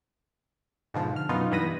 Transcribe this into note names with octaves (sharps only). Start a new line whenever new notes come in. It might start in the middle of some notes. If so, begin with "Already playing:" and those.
G#2 B2 D3 F3
F6
F#2 B2 B3 D#4 F4
G2 E3 B3 B5 A#6 D#7